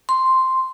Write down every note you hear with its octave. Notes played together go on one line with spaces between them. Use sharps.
C6